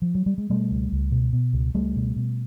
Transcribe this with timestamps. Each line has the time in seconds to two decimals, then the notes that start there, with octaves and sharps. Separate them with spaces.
0.02 F3
0.15 F#3
0.26 G3
0.38 G#3
0.49 B2 G3 A3
0.71 C#2
0.92 C#2
1.12 B2
1.33 B2
1.53 C#2
1.74 C#2 G3 A3
1.95 B2
2.16 B2